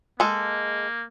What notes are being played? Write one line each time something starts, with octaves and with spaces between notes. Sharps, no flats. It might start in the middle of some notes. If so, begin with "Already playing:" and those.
G#3 A#3 A4